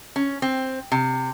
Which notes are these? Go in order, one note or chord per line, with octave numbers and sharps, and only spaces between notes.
C#4
C4
C3